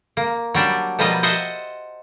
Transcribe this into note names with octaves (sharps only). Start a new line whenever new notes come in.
A#3
F#3 G3 D4
B2 F3 G3 A#3 B4 D#5
C5 D#5 E5 F#5 A5